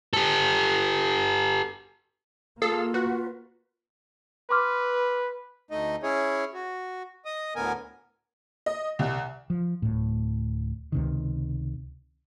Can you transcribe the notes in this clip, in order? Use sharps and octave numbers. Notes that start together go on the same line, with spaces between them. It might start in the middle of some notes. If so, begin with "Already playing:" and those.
G4 A4
A#3 F4 G#4 A4 F5 E6
F#4 B4
B4 C6 D6 F6
D2 A3 D#4 D#5
C#4 E4 G#4 C#5
F#4
D#5 D#6
D2 A2 D3 B3 A#4 G#5
D#5
C2
F3
D1 A2
C#2 C3 D#3